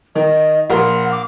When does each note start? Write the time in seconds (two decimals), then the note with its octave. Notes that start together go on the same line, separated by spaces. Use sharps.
0.15 D#3 D#5
0.70 A#1 A#4 F#5 C6
1.12 D6